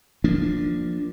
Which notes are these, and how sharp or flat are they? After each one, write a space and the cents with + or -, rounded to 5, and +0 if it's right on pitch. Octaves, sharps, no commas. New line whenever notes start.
F3 +0 A#3 +0 D4 +0